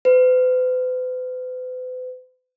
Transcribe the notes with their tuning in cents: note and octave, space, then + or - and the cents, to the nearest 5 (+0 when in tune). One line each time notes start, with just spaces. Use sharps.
B4 +45